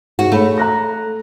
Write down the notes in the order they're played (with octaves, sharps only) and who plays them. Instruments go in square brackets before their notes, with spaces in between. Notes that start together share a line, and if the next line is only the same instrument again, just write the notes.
[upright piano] G#2 [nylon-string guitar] F#4
[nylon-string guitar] A3 [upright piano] G#4 C#5 B5
[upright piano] A#5 F#6 A#6